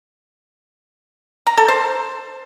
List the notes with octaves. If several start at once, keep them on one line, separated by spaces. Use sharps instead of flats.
A#5
A4
C5